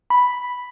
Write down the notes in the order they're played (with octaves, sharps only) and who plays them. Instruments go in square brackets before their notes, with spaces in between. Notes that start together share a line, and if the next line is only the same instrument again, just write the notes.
[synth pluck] B5